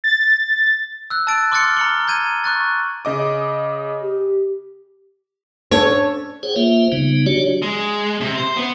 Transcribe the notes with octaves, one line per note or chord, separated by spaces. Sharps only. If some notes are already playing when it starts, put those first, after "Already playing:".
A6
E6 F#6
A5 E6 F#6 A6 D7
C6 D6 F6 F#6 A6 C#7
A#5 F6 C#7 F#7 G7
A#5 G6 G#6 D#7
C#6 F#6 A6
C#3 D#5 D6
G4
C#4 D4 A4 C#5
G#4 C5 C#5 F#5 G5
A#3 F4 C5 E5
C#3 G3 B3 D#4
F#3 D4 F#4 G4 C#5 D5
G#3
C3
C5
B3